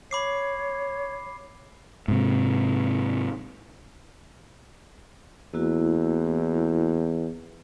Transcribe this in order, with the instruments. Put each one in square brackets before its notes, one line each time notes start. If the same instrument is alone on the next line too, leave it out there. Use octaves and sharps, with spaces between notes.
[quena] C#5 [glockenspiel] B5 D6 C7
[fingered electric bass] G#2 C3
[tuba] E2 [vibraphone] A#3 E4 F#4